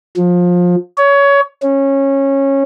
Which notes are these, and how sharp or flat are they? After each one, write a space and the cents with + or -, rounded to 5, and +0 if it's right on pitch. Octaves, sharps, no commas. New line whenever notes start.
F3 +25
C#5 +20
C#4 -15